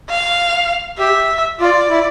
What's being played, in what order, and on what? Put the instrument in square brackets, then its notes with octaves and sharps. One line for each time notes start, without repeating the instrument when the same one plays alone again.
[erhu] F5
[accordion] G4 [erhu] E5
[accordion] F4 [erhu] D5
[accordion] E4